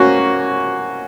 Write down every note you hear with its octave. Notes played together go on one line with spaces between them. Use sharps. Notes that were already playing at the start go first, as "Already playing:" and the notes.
Already playing: A#3 C#4 F#4